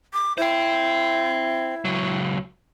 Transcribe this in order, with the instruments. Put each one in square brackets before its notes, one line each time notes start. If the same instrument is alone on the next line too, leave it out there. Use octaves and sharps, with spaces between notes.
[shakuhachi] D6
[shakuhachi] E4 [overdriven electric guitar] C5 G5
[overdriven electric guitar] C#2 F#3